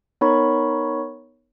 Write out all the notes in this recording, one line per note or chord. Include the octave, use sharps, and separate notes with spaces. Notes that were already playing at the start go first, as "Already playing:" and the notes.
B3 D#4 A#4 C#5 B5 C#6